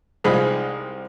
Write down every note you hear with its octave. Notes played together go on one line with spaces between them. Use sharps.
C2 G#3 C4 D#4 F4 B5